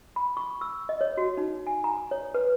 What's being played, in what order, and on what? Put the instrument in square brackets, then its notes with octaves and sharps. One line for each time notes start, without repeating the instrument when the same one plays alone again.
[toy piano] B5
C#6
E6
D#5
C#5
F#4
D#4
G#5
A#5
C#5
B4